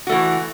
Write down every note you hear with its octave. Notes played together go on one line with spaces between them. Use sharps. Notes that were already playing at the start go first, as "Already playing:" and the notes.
E3 A3 F#4